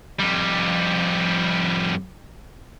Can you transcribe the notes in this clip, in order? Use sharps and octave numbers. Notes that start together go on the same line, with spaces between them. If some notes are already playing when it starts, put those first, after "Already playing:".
F2 G3